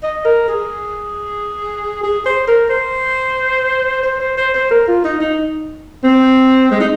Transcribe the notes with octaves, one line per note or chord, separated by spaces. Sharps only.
D#5
A#4
G#4
G#4
C5
A#4
C5
C5
C5
C5
C5
A#4
F4
D#4
D#4
C4
G#3
D#4